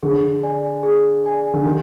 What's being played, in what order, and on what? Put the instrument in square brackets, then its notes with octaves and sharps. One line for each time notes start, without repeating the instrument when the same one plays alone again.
[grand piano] D3 [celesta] G#4
[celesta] D5 G#5
G#4
D5 G#5
[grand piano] D3
[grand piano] D#3 [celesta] G4